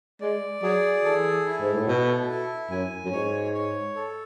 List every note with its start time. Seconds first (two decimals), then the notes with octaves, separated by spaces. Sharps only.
0.21 G#3 D5
0.63 F#3 G#4
1.05 E3 A4
1.46 E4
1.61 G#2
1.74 A2
1.87 B2 A4
2.29 E4
2.70 F#2 G#5
3.05 F#2
3.12 G#2 C#5
3.54 C#5
3.96 A4